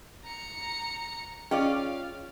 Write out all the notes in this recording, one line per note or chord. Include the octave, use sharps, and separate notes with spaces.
A#5 C#7
C#4 F4 G#4 D5 D#5 F5 G5